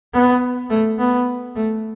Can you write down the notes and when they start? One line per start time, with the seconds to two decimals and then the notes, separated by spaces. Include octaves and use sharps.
0.14 B3
0.70 A3
0.99 B3
1.56 A3